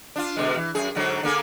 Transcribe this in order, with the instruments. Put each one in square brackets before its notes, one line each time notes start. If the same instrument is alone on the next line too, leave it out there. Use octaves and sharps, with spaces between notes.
[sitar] D4 F4
B2 D3 G#3
E3
F#2 G#4
G#2 D3 F#3
D3 A#3 G#4